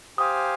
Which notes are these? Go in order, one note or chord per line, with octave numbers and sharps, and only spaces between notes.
G4 C5 F5 G#5 D#6